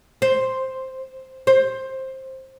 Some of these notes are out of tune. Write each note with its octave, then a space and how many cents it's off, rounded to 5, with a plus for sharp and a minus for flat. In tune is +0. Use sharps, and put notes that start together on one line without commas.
C5 +5
C5 +15